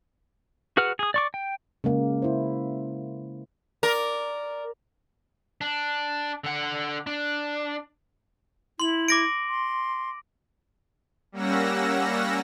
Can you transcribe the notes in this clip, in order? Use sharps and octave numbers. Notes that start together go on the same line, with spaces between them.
F#4 G#4 B4 F#5 F6
G#4 D#6
D5 C#6 D6
G5
C#3 G#3 A#3
E4 C5
A#4 D5
D4
D3 F#5
D4
E4 C6 F#7
D6 A#6 D7
C6
G3 A#3 C#4 F#5 E6 A#6